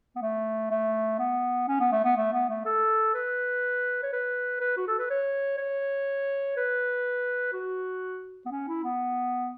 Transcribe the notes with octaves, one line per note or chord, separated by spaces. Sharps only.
B3
A3
A3
B3
C#4
B3
A3
B3
A3
B3
A3
A4
B4
C#5
B4
B4
F#4
A4
B4
C#5
C#5
B4
F#4
B3
C#4
E4
B3